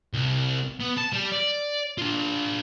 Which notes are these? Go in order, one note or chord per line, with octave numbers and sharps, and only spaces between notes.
C2
B3
A5
G3
D5
D4 F4